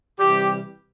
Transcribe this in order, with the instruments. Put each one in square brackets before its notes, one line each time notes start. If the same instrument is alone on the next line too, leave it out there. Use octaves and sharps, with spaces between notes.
[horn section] C3 E3 G3 G4